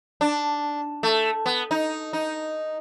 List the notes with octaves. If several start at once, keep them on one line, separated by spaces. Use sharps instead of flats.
D4
A3
B3
D#4
D#4